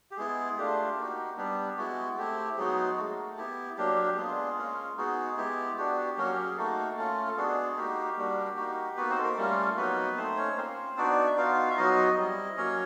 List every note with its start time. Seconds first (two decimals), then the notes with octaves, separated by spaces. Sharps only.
0.11 G4
0.17 G#3 B3 E4 G#4
0.57 A3 D4 F4 G4
0.97 A#3 D#4 F#4
1.37 G3 B3 D4 G4
1.77 G#3 B3 E4 F#4
2.17 A3 C4 E4 G4
2.57 F#3 G#3 B3 D#4 F#4 G#4
2.97 A3 A#3 D#4 F#4 A4
3.37 B3 E4 G4
3.77 F#3 A#3 D4 G4
4.07 G4
4.17 G#3 B3 D4 F4 G#4
4.57 A#3 C#4 F4
4.97 G#3 B3 D#4 F#4 G#4
5.37 G#3 B3 E4 G4
5.77 B3 D4 F#4 G4
6.17 F#3 A#3 C#4 F#4
6.32 G4
6.44 G#4
6.57 A3 A#3 D#4 F#4 A4
6.97 A3 C#4 F4 A4
7.28 A4
7.37 G#3 B3 D4 F#4 G#4
7.77 A#3 D#4 F#4 G4
8.17 G3 A#3 D4 F#4
8.57 A#3 D#4 F#4
8.96 A#3 B3 D#4 F#4 B4
9.10 C4 C5
9.18 A4
9.23 A#3 A#4
9.37 G3 A3 A#3 C#4 F4 A4
9.77 F#3 A#3 B3 D#4 F#4 B4
10.17 A3 C4 D#4 C5
10.37 C#4 C#5
10.57 A#3 C4 C#4 F4 C5
10.97 B3 D4 D#4 F#4 D5
11.26 E5
11.37 B3 D#4 F4 F#4 F5
11.71 E5
11.77 F#3 B3 D#4 F#4 D#5
12.17 G3 C4 E4
12.57 F#3 A#3 C#4 C#5